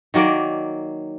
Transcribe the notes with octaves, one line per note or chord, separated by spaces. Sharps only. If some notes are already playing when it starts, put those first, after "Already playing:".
D#3 F#3 A#3 D5